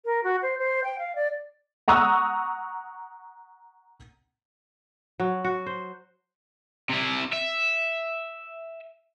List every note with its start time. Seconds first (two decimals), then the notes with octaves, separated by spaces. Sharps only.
0.05 A#4
0.23 F#4
0.42 C5
0.59 C5
0.84 G5
0.98 F5
1.15 D5
1.88 F#5 A#5 C#6 D#6 E6 F#6
5.20 F#3
5.44 F#4
5.66 C5
6.90 C3 E4
7.33 E5